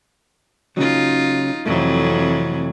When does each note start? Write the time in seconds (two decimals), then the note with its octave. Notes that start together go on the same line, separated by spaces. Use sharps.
0.77 C#3 F#3 D#4 F4
1.66 F2 C3 E3 F#3 A3